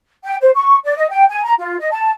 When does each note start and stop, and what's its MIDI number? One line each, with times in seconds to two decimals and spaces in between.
0.24 0.35 79
0.41 0.50 72
0.55 0.77 85
0.84 0.95 74
0.96 1.08 75
1.10 1.24 79
1.29 1.43 80
1.44 1.53 82
1.58 1.76 65
1.79 1.88 75
1.91 2.10 81